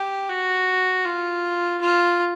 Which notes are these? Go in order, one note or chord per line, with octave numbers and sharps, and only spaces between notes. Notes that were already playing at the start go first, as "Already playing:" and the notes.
Already playing: G4
F#4
F4
F4